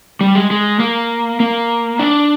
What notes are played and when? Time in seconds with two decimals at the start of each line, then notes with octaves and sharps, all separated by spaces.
0.21 G3
0.35 G#3
0.51 G#3
0.80 A#3
1.40 A#3
1.99 D4